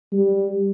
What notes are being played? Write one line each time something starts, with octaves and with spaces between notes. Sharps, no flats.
G3